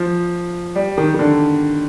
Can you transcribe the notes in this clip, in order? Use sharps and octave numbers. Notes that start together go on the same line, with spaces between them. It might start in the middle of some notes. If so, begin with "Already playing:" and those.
Already playing: F3
G3
D#3
D#3
D3